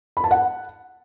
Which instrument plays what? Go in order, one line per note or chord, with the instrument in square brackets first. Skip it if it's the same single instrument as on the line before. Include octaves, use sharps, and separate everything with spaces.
[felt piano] B5
A5
F#5